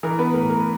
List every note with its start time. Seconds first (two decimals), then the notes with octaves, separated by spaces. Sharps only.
0.03 E3 A#4
0.18 B3 B4
0.34 A2 A#4
0.50 A#4